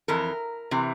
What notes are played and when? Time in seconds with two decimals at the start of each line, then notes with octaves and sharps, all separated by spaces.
0.08 F2 E3 A#4
0.71 C3 E3